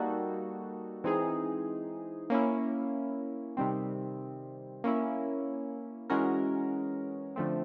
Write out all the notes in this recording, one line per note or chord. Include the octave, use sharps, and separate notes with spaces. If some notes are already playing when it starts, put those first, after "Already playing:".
Already playing: G3 A#3 D#4 F#4 A4
E3 G#3 C4 D#4 G#4
A#3 C#4 E4
C3 D#3 G3 C4
A#3 C#4 E4
E3 G#3 C#4 F#4 A#4
D3 F3 A3 C4